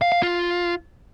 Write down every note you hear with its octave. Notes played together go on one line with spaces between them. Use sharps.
F5
F5
F4